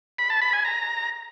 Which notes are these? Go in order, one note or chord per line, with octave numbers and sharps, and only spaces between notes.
B5
A5
B5
G#5
A#5